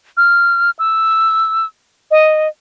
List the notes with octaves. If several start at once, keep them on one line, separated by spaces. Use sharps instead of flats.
F6
E6
D#5